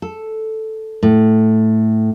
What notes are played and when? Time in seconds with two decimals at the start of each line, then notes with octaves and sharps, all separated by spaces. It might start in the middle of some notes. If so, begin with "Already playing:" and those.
0.02 A4
1.03 A2